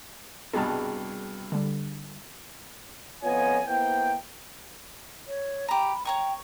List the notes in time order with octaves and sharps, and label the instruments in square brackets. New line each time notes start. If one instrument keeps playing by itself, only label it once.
[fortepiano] C2 G2 B2 [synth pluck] G#4 A5
[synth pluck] D3 G3
[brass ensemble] F2 B3 F4 C#5 D#5 G#5
A#3 B3 E4 C5 G5
[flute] C#5
[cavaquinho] G4 A#5 [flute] B5
[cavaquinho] C#5 A#5 C#6 [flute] G5